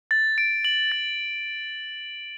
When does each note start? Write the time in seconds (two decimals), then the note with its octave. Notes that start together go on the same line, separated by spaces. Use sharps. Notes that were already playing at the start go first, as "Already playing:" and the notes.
0.11 A6
0.38 D7
0.65 F#7
0.92 A6